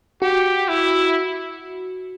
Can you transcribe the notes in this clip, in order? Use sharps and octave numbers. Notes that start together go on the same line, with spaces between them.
F#4 G4
E4